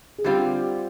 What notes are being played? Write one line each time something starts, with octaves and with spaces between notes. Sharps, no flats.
G#4
D3 G3 C4 F4 G4